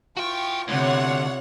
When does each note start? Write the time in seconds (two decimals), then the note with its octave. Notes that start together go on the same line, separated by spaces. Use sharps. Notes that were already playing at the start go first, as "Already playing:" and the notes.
0.17 E3 F4 F#4 G5 C#6
0.68 D2 C3 B3 C#5 D5 F#5